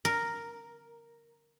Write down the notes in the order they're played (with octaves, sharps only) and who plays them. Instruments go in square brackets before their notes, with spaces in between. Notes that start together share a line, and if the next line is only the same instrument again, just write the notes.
[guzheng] A#4